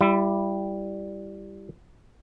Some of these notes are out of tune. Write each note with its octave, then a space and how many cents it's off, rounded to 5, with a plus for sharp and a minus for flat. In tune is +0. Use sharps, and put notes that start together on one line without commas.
G3 +0 E4 +30